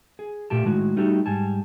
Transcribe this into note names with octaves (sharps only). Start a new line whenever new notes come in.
G#4
A#2 A3 G4 A5
A2 D#3 G#3 F#4
G3 A3 D#4 F#4 G4 A4
G#2 G3 G#5 A5